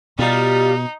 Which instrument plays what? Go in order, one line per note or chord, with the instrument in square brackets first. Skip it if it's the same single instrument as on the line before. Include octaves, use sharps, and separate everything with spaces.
[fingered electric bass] B2 [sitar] G3 F4 [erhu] D#4